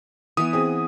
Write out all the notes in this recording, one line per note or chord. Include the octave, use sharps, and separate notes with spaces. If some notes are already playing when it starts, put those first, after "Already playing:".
E3 B3 D#6
C4 G#4